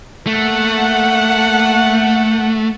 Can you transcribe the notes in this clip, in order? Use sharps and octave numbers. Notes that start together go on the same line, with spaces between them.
A3 A#3 F#5